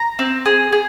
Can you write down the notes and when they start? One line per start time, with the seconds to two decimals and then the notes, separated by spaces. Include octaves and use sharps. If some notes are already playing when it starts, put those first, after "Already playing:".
Already playing: A#5
0.19 C4
0.46 G#4
0.72 G#4